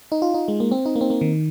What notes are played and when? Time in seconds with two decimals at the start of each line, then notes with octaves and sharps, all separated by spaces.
0.12 D#4
0.22 F4
0.34 D#4
0.48 G#3
0.60 A#3
0.71 C4
0.85 D#4
0.96 A#3
1.01 C4
1.10 A#3
1.21 D#3